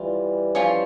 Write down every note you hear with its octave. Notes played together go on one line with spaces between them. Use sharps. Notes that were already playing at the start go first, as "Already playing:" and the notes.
Already playing: E3 G3 F4
F3 C#4 F4 C#5